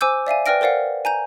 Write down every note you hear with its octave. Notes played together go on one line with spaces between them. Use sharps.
C5 G#5 D6 E6 G6
D5 E5 F5 G#5
B4 D5 G5 F6 A#6 D7
A#4 C5 D5 F5 F#5
G#5 A#5 G6 D#7